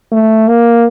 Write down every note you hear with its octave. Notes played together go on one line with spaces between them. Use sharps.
A3
A#3